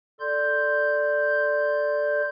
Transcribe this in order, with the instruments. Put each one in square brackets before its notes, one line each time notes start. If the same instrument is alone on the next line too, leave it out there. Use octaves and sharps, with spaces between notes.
[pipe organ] A4 D5 C6 G6